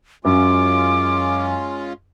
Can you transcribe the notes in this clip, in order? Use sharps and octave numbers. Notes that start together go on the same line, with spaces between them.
F#2 G#3 C#4 F4 D6